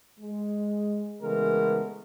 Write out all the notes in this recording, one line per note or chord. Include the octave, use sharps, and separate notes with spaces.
G#3
C#3 E3 G#3 A3 B3 A#4